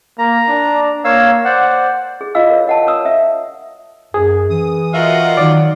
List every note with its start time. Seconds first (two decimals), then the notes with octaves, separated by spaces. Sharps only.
0.18 A#3 A#5
0.48 D4
1.05 A#3 C#5 F5 E6
1.45 C5 D5 F#5
2.21 G#4
2.35 F4 D#5 F5 E6
2.50 A#4 C#5
2.67 D#5 F#5 A5
2.87 C#5 A#5 D#6 E6
3.06 E5
4.14 F#2 G#4
4.50 E3 D#6
4.94 F4 F#4 A#4 D#5 E5 F#5
5.37 D#3 F#3 D5